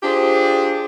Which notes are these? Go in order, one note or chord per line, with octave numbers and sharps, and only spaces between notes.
D4 F4 G4 G#4 C5